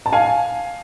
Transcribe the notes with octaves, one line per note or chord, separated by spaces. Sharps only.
A5
F5 G#5